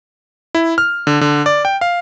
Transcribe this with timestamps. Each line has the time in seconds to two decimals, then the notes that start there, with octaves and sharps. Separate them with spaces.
0.55 E4
0.78 F6
1.07 D3
1.21 D3
1.46 D5
1.65 G5
1.81 F5